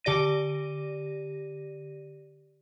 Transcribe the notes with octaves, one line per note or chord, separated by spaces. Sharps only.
D3 G4 D5 A#6 D#7